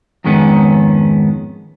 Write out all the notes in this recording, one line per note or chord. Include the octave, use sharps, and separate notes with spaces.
F2 G#2 D#3 G#3 B3 C#4